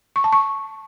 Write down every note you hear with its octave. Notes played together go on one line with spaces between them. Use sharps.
C#6
A5
C#6